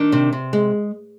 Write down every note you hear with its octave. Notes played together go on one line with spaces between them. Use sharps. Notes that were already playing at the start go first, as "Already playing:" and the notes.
Already playing: D#3 D4
C3
C3
G#3